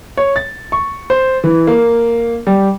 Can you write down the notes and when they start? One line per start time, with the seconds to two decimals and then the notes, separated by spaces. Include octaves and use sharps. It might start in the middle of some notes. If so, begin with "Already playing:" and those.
0.17 C#5
0.36 A6
0.72 C#6
1.10 C5
1.44 E3
1.67 A#3
2.47 G3